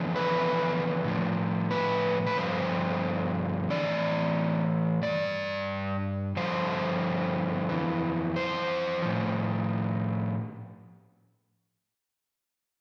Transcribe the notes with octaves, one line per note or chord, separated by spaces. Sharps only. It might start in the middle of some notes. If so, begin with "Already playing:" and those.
Already playing: E2 D3 F3
B4
A2 F3
B4
B4
G2 D3 F3 C5
A2 E3 D5
G2 E3 D5
G2 D3 F3 C5
F2 E3
C5
A2 F3